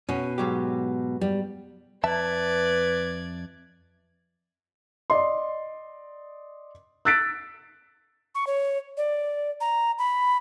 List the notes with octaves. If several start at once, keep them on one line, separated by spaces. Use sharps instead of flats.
B2 C#4
G#2 F#3 G4
G3
F2 B4 D5 E5 A5 G#6
D5 D#5 C6
E6 F#6 A6 B6 D7
C#6
C#5
D5
A#5
B5